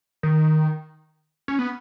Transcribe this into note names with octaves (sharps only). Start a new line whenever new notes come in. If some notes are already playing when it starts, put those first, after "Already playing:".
D#3
C#4
B3